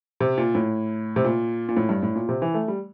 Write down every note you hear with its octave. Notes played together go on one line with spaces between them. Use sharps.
C3
A#2
A2
C3
A#2
A#2
A2
G2
A2
A#2
C3
E3
A3
G3